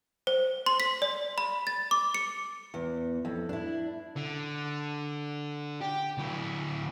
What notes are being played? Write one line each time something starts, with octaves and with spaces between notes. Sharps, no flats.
C5
C6
B6
D5
B5
A6
D6
C#7
E2
F2
D4 E4
D3
G4
D2 E4